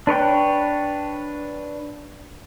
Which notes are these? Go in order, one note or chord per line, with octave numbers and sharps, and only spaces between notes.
D4 B4 C#5 G5